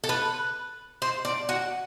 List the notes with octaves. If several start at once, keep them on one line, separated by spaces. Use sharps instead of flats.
A4
B4
C5
D5
F#4